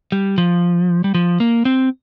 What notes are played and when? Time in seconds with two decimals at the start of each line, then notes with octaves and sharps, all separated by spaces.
0.12 G3
0.38 F3
1.04 G3
1.15 F3
1.40 A#3
1.65 C4